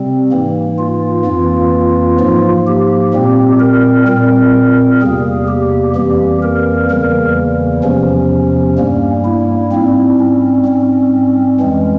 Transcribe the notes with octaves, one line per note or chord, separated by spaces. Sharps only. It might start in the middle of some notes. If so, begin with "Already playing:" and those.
Already playing: C3 G3 C4
G#2 E3 A#3
F4
F2 E3 A#3
G#2 F3 A#3
G4
A#2 G3 C4
A#4
A#2 G3 C4 A#4
E2 C3 G3 A#3 G#4
G4
F2 E3 G3 A#3 G4
A#4
E2 C#3 E3 G3 A#3 A#4
E2 C3 F3 C#4
G2 G3 A#3
E4
G#2 G3 C4
C#4
G#2 G3 C4
F2 E3 G#3 C#4